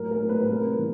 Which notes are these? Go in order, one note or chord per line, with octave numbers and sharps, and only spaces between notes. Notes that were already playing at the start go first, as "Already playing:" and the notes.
Already playing: A2 F#3 A#4
A#4
A2
B4
C3 A#4
E3